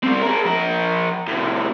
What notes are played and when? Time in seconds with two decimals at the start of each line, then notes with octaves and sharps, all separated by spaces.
0.03 G3 C4
0.22 G#4 A#4
0.46 F3 A#4
1.28 A2 C3